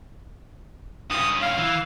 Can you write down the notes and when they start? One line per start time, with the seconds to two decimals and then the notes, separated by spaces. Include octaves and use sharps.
1.10 G2 C#4 D#6
1.42 F5
1.58 E3